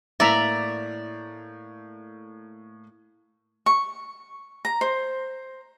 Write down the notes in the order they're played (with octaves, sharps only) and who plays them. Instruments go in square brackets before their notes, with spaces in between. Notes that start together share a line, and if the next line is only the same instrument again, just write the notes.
[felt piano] A2 A#3 [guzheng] D5 [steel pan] E5 A#5
[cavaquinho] C#6
A#5
C5